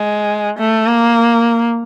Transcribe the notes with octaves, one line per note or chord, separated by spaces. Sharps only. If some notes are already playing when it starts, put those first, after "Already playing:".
Already playing: G#3
A3
A#3